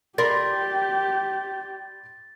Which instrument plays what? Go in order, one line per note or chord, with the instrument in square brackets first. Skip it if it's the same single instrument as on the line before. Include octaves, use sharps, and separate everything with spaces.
[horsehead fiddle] G4 [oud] A#4 [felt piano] D5 B5 C6 [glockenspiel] A6